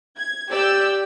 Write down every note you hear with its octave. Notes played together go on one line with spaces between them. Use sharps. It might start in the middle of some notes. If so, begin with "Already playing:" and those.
G#6
G4 D5 E6 G6